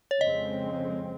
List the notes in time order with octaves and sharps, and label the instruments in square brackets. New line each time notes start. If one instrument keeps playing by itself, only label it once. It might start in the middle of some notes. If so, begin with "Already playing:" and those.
[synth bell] C#5
[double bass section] F2 C#3 G#3 C4 [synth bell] D#5